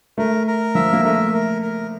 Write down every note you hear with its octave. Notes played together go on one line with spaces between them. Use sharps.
A3 A#4
A#4
F3 E5
A#3
A3 A#4
A#4
A#4